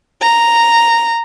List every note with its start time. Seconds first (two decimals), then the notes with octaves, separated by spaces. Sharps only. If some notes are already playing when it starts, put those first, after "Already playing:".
0.21 A#5